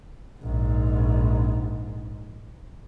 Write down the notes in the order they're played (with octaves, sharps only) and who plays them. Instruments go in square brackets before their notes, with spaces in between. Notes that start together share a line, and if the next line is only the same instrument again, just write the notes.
[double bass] A#1 G#2